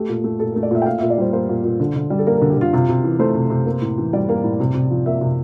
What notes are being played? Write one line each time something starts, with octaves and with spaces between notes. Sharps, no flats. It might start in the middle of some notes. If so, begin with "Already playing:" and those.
Already playing: A3 G4
A#2
A3
A#2 A4
A3 A#4
D5
A#2 E5
G5
A#2 F5
A#2 E5
D5
G3 C5
A#3 C5
A#2
A#2
D3
D3
G3
A4
A#3 A#4
D3 A#4
G4
D3 F4
C3 F4
C3
E3
A3 C5
C3
C3
A#3
A2
E3
G3 D5
A#3
A2
C3
C3
F3
A#3 E5
C3